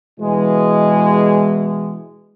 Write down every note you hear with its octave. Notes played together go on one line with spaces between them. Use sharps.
B2 E3 G#3